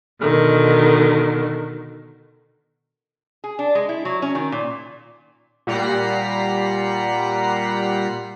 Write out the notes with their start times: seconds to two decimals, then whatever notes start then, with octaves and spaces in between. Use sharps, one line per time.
0.21 B2 D3 D#3
3.44 G#4
3.59 D4
3.75 G#3
3.89 E4
4.05 F#3
4.22 C#4
4.35 D#3
4.52 A#2
5.67 A#2 G3 F#5 A#5 B6 C7